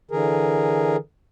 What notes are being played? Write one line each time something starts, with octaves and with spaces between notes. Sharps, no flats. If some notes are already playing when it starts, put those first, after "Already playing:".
D3 E3 G#4 A#4